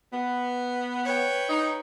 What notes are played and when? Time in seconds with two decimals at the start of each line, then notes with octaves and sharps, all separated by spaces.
0.13 B3
1.05 B4 C#5 G5
1.49 D#4